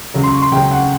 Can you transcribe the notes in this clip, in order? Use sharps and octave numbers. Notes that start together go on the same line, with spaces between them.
C#2 C#3 F#3
C6
C#6
C6
C#2 C#3 F#3 G5
F#5